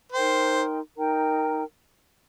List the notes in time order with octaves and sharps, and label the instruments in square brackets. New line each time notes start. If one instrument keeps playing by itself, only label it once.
[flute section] D#4 A#4 G5 C6 [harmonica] C5
[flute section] D#4 A#4 G5 A#5